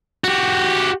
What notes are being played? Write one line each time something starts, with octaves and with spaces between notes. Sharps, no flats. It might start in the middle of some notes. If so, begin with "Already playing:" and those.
F#4 G4